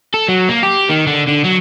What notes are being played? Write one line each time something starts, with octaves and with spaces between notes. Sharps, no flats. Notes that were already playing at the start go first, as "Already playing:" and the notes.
A4
F#3
A#3
G4
D#3
D3
D3
F#3